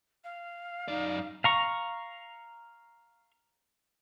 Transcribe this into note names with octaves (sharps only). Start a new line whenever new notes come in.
F5
F#2 D#4 D5
F5 A#5 C#6